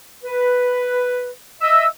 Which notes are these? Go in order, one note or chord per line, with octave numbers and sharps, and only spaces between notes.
B4
D#5 E5 E6